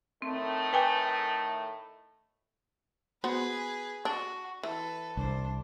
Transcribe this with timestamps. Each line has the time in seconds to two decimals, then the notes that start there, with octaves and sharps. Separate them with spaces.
0.22 A2 D#3 A3 C4
0.73 B4 G5 G#5
3.24 B3 F#4 G#4 B4 C5
4.05 D4 F#4
4.63 E3 A4 B4
5.17 C2 D4 C5